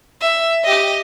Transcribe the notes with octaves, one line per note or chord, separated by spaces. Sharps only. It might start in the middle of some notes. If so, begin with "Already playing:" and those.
E5
G4 D#5